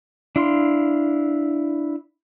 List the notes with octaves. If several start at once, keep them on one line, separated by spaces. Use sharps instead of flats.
D4 E4 F5 C6